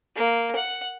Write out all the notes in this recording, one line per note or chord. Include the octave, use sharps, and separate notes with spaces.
A#3
F#5